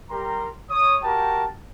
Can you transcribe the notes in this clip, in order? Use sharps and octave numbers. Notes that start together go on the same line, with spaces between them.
G3 G4 A#4 A#5 C6
C#5 D#6
F#4 G4 A#4 G5 A5